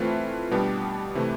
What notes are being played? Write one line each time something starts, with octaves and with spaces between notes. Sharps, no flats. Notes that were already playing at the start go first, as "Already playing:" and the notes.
Already playing: E3 A3 C4 F4 B4
B2 G3 B3 D4 G4
C3 E3 A3